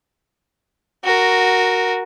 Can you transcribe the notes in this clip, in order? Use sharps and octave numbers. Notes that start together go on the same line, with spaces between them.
F#4 A#4